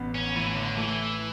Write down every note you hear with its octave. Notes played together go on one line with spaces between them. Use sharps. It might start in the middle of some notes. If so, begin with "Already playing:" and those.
Already playing: A1 B3
C#4
A2 E3
D3
E3 A3